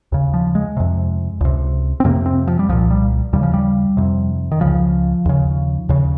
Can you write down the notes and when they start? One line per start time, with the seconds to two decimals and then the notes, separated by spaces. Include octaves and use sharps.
0.12 D#2 C#3
0.34 F3
0.55 G#3
0.77 F2 C3
1.41 C#2 C3
2.00 C4
2.04 F2 C3 A#3
2.26 C4
2.47 F3
2.59 G3
2.69 C2 A#2 F3
2.91 G3
3.33 D#2 C#3 G3
3.43 F3
3.54 G3
3.97 F2 C3
4.51 D#3
4.61 C#2 C#3 F3
5.25 D#2 C#3
5.89 D#2 C#3